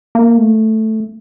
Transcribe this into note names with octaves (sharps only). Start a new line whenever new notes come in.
A#3
A3